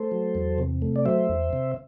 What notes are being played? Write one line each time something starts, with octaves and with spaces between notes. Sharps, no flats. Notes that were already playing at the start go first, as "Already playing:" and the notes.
Already playing: A3 A4 C5
F#3
E2
C3
A3
D5
F#3 C5 E5
E2
C3